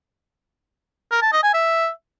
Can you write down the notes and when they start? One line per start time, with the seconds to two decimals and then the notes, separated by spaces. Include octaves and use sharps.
1.12 A#4
1.22 A5
1.33 D#5
1.43 G#5
1.54 E5